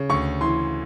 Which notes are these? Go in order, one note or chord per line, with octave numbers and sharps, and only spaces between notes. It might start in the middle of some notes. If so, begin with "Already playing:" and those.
Already playing: C#3
D2 C#6
E3 C6